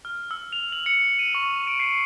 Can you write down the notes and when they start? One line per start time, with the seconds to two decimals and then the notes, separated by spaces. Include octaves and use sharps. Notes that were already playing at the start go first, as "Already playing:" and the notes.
0.05 F6
0.31 E6
0.52 F7
0.72 F#7
0.86 C#7
1.19 D#7
1.35 C#6
1.49 D#7
1.67 D7
1.80 C7